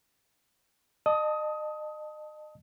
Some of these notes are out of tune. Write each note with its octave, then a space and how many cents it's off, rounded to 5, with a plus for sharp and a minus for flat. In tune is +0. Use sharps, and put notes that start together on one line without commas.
D#5 -35 A5 +0 D#6 +20